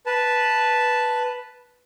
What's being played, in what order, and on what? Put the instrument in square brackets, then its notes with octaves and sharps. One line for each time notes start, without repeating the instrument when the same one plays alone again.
[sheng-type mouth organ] B4 A5